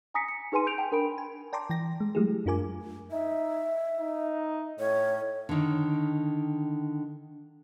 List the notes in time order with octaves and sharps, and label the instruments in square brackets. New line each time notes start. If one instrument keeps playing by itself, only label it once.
[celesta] G#5 A#5 D#6 A#6 B6 C#7
C#7
D#4 G#4 B4 G#5 C6 D#7
G6 D7 F7
G5 A5
D4 A#4 B5 D7
[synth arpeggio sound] G#5
D5 G5 A5 A#5 C6 D6
E3 G5 A#6
G#3
F#3 G#3 A3 E4 G4 G#4
F#2 D4 F4 A#4 G#5 D6
[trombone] D#4 [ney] E5
[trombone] D#4
[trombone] A2 [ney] C#5
[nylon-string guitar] D3 D#3